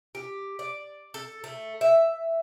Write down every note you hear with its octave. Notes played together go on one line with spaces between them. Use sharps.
G4
D5
A4
A3
E5